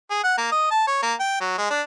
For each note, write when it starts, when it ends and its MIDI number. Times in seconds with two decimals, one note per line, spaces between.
0.10 0.19 68
0.24 0.35 78
0.38 0.49 58
0.52 0.69 75
0.71 0.84 81
0.87 0.99 73
1.02 1.13 58
1.20 1.40 79
1.41 1.56 54
1.58 1.67 56
1.70 1.81 62